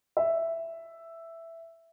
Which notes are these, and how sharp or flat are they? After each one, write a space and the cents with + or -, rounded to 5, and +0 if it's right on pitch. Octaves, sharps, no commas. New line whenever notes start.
E5 +5